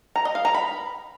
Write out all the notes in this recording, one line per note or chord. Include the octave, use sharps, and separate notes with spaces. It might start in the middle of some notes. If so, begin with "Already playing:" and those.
A#5
D#5
F5
A#5
B5